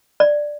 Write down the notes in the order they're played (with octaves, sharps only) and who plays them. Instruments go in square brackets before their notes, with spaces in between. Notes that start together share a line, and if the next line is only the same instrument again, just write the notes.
[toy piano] D5